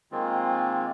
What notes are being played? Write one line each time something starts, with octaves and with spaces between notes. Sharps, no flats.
D#3 G#3 A#3 C4 F4